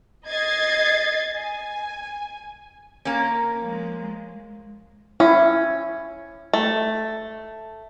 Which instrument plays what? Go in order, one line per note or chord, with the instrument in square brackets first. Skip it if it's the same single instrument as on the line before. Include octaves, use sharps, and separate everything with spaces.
[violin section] D#5 G#6 A6 C7
G#5
[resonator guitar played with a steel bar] A#3 C#4
[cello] F3 G#3
[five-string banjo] C#4 [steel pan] E4
[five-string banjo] A3